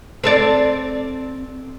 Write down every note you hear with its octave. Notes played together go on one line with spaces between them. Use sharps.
C4 A4 D5